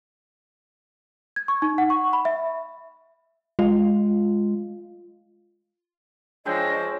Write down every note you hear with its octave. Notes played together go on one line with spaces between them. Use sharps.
G#6
C#6
D#4
F#5
C#6
B5
E5
G#3 F4
F3 G#3 D4 C#5 D#5 G5 E6